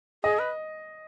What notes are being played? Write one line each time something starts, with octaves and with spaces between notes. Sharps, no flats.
G#4 D#5
B4